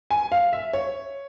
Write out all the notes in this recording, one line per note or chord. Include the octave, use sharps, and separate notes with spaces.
G#5
F5
E5
C#5